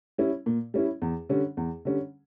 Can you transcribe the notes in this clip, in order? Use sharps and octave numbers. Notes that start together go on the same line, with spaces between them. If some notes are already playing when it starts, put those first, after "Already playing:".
G3 C#4 E4
A#2
G3 C#4 E4
E2
D3 G3 C#4
E2
D3 G3 C#4